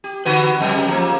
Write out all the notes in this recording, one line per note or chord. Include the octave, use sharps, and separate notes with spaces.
G4
D3 F#4 B4
F2 C#3 G3
F3 A#3